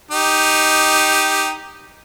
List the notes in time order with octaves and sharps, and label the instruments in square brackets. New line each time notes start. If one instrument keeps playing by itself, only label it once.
[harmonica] D#4 G4